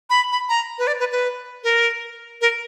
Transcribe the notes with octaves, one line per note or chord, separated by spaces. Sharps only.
B5
B5
A#5
B4
D5
B4
B4
A#4
A#4